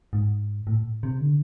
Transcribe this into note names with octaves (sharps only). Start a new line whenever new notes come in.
G#2
A2
C3
D3